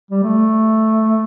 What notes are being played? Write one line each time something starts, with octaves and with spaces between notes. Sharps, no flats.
G3
A3